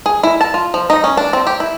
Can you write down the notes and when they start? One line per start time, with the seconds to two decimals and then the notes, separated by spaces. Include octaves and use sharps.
0.06 G#4
0.23 E4
0.41 A5
0.54 F4
0.74 F3
0.90 D#4
1.04 C#4
1.17 D4
1.33 C4
1.47 G4
1.60 E4